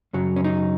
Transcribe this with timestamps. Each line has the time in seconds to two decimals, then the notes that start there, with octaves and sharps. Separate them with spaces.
0.13 F#2 C#3 F#3
0.36 C#4
0.44 D#4